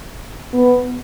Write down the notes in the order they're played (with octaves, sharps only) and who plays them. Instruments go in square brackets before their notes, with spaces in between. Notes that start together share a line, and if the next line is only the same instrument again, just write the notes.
[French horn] B3